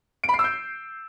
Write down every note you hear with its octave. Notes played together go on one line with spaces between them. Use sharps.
D7
B5
C7
E6
G6